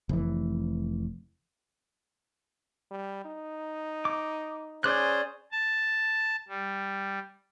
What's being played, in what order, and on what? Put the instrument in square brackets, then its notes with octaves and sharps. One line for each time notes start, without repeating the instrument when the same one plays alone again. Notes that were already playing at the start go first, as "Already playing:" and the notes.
[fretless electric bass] F1 E3
[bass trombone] G3
D#4
[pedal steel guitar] D6
[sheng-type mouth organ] C#4 G#4 C5 [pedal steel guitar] D5 D6 F#6
[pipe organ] A5
G3